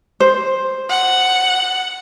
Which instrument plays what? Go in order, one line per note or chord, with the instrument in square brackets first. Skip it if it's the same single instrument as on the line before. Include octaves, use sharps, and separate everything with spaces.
[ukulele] C5
[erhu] F#5